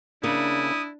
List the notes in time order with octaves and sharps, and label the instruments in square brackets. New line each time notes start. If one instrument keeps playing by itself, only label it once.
[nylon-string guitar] C#3 A#3 [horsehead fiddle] D4 [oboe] E4 [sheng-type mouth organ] D#6